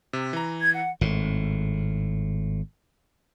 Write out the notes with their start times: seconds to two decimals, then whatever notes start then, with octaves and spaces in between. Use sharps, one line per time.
0.13 C3
0.33 E3 A#5
0.61 G#6
0.75 F#5
1.01 G#1 A2